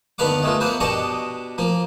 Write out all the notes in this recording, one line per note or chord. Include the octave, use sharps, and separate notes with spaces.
D#2 D3 B3 B4 F5 D6
G#3 A3 F4
A#3 B3 B4 C5
B2 D4 G4 D#5 A5 C#6
F3 A#3